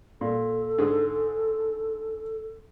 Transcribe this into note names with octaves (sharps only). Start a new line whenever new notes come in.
A#2 A4
G#2 D3 G#4